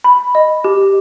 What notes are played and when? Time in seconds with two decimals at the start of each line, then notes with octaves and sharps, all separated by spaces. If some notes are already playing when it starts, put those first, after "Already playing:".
0.04 B5
0.35 D#5
0.64 G4